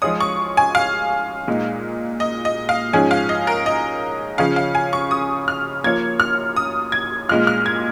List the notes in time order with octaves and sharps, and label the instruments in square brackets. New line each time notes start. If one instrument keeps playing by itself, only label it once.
[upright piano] F3 G#3 F4 G#4 C#5 [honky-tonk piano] D#6
[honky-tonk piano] C#6
G#5
F5
[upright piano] A#2 G#3 D#4
[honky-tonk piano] D#5
D#5
F5
[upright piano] G#2 F3 C#4 G#4 [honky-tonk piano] G#5
[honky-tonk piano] F5
D#5
A#4
D#5
[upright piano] C#3 F3 C#4 G#4 C#5 [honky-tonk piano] F5
[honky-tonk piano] F5
G#5
C#6
D#6
F6
[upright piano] F3 A#3 F4 C#5 [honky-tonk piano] G#6
[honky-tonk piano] F6
D#6
G#6
[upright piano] A#2 G#3 F4 [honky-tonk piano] F6
[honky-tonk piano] F6
G#6